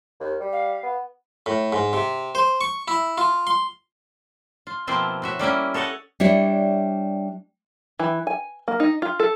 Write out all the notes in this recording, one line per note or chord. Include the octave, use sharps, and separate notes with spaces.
D#2
G3
F5
B3
A2
G#2
C3
C5
C#6
E4
F4
C6
F4
B2 F3 A#3 C4 E4 F4
A2 F#4 E5
G3 A#3 C#4 E4
A4 C#5 D#5 F#5 A5
G3 D4 E4 C#5 D5
E3
G#5
A#3
D#4
F4
A4